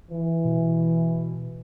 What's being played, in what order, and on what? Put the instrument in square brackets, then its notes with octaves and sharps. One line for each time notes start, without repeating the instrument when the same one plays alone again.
[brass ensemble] E3
[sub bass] B2